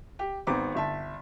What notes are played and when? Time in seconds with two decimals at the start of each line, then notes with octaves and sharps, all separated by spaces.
0.19 G4
0.47 G#1 B3 C4 A#5 D6
0.75 G1 E5 A5